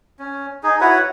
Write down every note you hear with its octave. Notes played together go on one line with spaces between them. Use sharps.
C#4
D#4 G#4
E4 F#4 B4 C#5